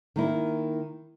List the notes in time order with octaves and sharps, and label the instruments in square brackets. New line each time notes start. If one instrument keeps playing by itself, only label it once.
[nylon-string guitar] D#3 A#3 E4